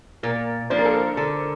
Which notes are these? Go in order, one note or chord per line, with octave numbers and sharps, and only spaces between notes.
A#2 A#4
F3 A#3 D4 C5
A#4
A4
A#4
D3 A4